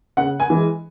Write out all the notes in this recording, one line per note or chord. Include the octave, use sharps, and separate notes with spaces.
C#3 F#5
G#5
E3 G#3